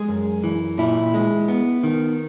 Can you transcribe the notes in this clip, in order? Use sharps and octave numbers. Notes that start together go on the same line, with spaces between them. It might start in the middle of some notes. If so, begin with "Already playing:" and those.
Already playing: G#3 G#4
F#2
E3
A#2 E4
G#3
B3
D#3